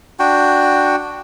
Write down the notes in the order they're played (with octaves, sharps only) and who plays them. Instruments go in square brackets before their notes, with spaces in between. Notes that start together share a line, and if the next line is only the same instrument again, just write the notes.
[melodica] D4 F#4 G5